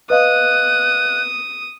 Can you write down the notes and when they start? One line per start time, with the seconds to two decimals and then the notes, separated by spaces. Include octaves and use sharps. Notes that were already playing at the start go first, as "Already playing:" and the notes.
0.10 B4 D#5 F5 D#6 F#6